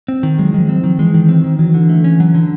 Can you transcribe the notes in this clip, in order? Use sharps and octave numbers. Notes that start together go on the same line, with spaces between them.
C4
D#3
F#3 G#3
D#3 F3
F#3 C4
F3
D#3
E3 G#3
D#3
C4
D#3
E3 F#3
D3
A3
C#4
F#3
D3